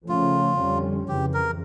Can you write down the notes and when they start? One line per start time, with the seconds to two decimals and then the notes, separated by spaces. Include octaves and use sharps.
0.08 C#3 F3 A3 C#4 F4
0.58 F2 D3 G3 C#4
1.08 F2 C#3 E3 G4
1.34 A#4